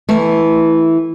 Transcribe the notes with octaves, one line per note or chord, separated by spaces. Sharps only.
E3 A3